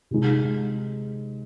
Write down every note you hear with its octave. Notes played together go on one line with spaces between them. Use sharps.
C3 D#3 G#3 D#4